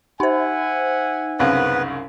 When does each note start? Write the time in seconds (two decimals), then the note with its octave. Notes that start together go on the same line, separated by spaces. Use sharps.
0.20 D#4 C5 E5 F#5 G#5
1.39 C2 F#2 C#3 B3 B4